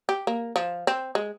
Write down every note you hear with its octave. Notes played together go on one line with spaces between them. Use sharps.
G4
A#3
F3
C4
G#3